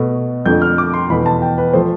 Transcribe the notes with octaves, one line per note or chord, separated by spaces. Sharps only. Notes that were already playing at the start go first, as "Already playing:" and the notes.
Already playing: B2 A3
F2 D3 A3 G6
F6
D6
C6
E2 B2 A3 B5
A5
G5
B4
F3 A3 C5